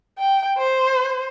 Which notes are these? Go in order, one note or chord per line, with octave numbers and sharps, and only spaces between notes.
G5
C5